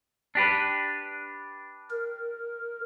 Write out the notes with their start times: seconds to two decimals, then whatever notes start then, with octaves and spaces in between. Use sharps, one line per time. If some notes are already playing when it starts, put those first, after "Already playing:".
0.35 D4 G4 B4
1.90 A#4